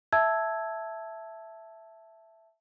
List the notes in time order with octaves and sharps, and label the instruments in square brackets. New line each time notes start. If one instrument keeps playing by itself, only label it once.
[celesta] E5 A5 E6 G#6